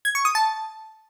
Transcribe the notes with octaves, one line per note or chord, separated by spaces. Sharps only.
G#6
C#6
D#6
A5